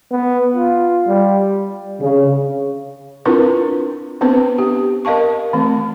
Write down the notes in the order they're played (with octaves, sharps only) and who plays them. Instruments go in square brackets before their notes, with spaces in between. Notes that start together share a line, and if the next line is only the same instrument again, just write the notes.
[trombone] B3
F4
G3
[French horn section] C#3
[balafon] C4 D4 E4 F4 A#4 B4
B3 C4 D4 B4 C5
G4
A#4 D#5 F5 A5 C#6
E3 A3 C4